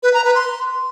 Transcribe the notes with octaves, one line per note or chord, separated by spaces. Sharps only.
B4
A#5
B4
C6